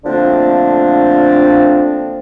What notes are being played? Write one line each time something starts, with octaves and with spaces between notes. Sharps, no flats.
D3 F3 A3 A#3 C4 D4